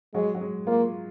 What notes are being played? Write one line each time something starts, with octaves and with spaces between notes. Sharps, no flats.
F#3 G#3
F#3
G#3
A#3 F4